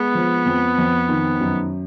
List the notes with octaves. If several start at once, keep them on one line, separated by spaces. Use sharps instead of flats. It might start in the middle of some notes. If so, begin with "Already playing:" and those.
Already playing: G#3 B3
F3
F2
F2
D#3
F#2